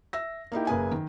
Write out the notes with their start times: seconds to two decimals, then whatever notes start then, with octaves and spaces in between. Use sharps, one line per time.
0.13 E5 E6 A#6
0.52 A#3 D#4 E4 G4
0.67 F#1 A#3 G#4 B4 G#5
0.92 D#3